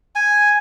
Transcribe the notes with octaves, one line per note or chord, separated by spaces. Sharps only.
G#5